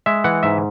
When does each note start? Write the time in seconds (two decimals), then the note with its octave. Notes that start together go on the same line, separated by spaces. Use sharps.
0.06 G#3 E5
0.24 E3 F#5
0.43 G#2 E5